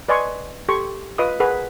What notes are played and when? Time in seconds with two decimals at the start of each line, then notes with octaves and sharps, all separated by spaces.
0.09 B4 D5 D#5 G#5 C6 C#6
0.69 G4 A4 C6 C#6
1.18 F4 B4 D#5 F5 D#6
1.40 G#4 A#4 B4 F#5